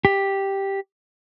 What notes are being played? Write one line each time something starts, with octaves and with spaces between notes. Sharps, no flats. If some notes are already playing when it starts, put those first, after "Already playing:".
G4